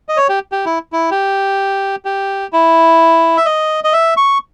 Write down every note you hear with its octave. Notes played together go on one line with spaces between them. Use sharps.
D#5
C#5
G4
G4
E4
E4
G4
G4
E4
E5
D#5
D#5
E5
C#6